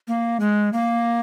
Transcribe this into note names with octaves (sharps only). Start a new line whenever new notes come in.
A#3
G#3
A#3